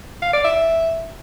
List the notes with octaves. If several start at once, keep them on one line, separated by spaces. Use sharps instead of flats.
F5
D5
E5